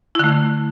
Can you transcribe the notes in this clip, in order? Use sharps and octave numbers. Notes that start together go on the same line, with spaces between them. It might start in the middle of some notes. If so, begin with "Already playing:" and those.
D3 A3 E4